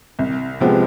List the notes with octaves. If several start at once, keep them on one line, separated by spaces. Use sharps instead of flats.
C2
C3 F3 G#3 B3